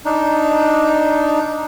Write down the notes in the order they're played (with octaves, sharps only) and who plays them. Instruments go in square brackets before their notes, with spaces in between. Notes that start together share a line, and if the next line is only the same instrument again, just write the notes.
[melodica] D4 D#4